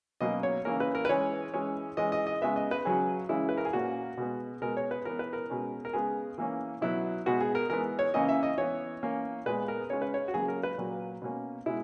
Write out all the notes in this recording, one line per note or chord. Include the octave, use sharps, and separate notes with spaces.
B2 F#3 A#3 C#4 D#5
C#5
C#3 E3 A#3 C#4 A#4
B4
A#4
B4
E3 G#3 C#4 C#5
E3 G#3 C#4
E3 G#3 C#4 D#5
D#5
D#5
C#3 G#3 B3 E5
D#5
B4
C#3 F#3 C#4 G#4
C#3 E3 G#3 C#4 E4
B4
A#4
G#4
A#2 A#3 C#4 F#4
B2 G#3 B3
B2 G#3 B3 A#4
C#5
B4
E3 B3 A#4
B4
A#4
B2 G#3 C#4
A#4
C#3 G#3 B3 G#4
E3 A#3 C#4
B2 F#3 B3 E4
B2 G#3 B3 F#4
G#4
A#4
E3 G#3 B3 A#4
C#5
C#3 E3 A#3 C#4 D#5
E5
D#5
E3 B3 C#5
E3 A#3 C#4
A#2 G#3 B3 B4
A#4
C#3 G#3 C#4 C#5
B4
C#5
F#4
C#3 F#3 A#3 G#4
A#4
B4
A#2 F#3 A#3
B2 A#3 C#4
B2 G#3 E4